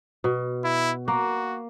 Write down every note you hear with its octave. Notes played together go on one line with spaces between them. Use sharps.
B2
E4
A#3 F#4